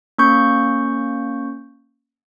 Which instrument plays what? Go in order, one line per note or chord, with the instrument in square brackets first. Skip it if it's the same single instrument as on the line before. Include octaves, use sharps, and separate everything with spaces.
[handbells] A#3 C#4 C#6 G6